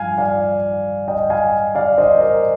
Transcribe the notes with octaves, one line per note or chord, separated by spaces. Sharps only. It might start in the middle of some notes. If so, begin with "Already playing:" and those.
Already playing: G2 F3 F5 G#5
D5 F5
D#5 G5
F5 G#5
D5 F5
C5 D#5
A#4 D5